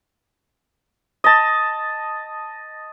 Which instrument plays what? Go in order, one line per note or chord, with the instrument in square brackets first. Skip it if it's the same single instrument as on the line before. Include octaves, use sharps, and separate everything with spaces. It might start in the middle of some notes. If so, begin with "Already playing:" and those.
[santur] D#5 A5